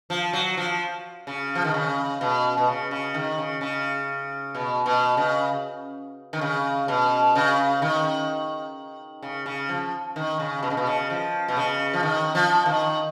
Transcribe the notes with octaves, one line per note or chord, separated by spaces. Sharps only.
F3
F#3
F3
C#3
F3
D#3
C#3
B2
B2
C#3
C#3
D#3
C#3
C#3
B2
B2
C#3
D#3
C#3
B2
C#3
D#3
C#3
C#3
F3
D#3
C#3
B2
C#3
B2
C#3
F3
B2
C#3
F3
D#3
F3
D#3